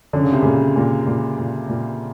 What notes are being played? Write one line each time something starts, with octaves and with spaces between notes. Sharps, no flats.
D3 C#4
C#3
C3
A#2 C#3
A#2
A#2
A#2
A#2